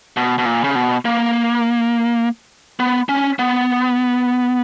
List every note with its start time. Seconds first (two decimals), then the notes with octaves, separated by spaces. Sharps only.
0.17 B2
0.38 B2
0.45 A#2
0.64 C#3
0.75 B2
1.05 A#3
2.80 B3
3.09 C#4
3.39 B3